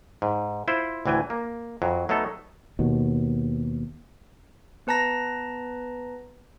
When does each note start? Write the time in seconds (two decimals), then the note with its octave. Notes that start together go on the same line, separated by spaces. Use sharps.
0.22 G#2
0.68 E4 F4 C5
1.06 D2 A2 E3 G5 G#5
1.30 A#3
1.82 F2 F#3
2.09 F#3 A3 B3 D#4 A4
2.79 D#2 B2
4.87 B3 B4 A5 A#5 A#6